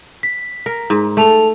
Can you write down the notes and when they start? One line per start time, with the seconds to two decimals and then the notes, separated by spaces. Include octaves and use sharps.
0.23 B6
0.66 A#4
0.90 G#2
1.17 A3 A4 A5 F7